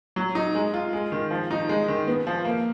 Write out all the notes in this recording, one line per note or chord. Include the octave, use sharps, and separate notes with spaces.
F#3
D#4
G#3
F4
G#3
D#3
F3
D#4
G#3
D#3
B3
F3
A#3